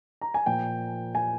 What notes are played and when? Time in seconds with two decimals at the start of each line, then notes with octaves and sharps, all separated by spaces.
0.21 A#5
0.34 G#5
0.46 A#2 F3 G5
1.15 G#5